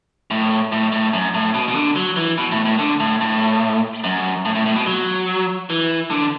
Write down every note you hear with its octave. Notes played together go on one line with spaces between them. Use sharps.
A2
A2
A2
F#2
A2
B2
B2
D3
F#3
E3
B2
A2
A2
D3
A2
A2
F#2
A2
A2
A2
B2
F#3
E3
D3